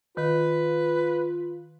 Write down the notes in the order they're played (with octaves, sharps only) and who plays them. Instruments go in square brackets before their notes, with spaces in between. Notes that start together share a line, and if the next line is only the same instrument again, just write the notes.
[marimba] D#3 [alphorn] F4 [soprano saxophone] B4